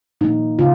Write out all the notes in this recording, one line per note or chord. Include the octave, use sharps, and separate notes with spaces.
A#2 F3 A#3 D#4
C#3 F4